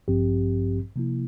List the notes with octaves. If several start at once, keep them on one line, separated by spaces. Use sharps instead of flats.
A1 G2 F3 C4 G4
C3 F3 A#3 E4